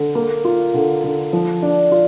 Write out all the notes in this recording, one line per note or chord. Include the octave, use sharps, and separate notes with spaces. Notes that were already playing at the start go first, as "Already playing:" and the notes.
Already playing: D3
A#3
F4
D3
D3
F3
D4
F4